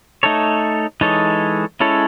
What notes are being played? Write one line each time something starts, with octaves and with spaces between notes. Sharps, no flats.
A3 D#4 A4 C#5
E3 G#3 D#4 A4 C#5
G#3 C#4 E4 A4 C#5